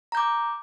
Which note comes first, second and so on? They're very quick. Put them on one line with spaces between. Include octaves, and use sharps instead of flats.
A#5 G6 D6